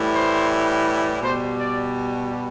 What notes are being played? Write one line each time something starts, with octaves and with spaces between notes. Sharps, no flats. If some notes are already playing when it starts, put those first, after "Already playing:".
Already playing: A2 E3 G3
C5
B2 G3 C5
D5